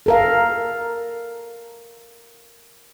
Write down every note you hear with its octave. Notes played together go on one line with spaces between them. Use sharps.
A4 A#4 F5